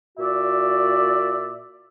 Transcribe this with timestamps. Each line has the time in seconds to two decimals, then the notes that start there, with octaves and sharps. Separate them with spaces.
0.18 A#2 F#4 D5 E5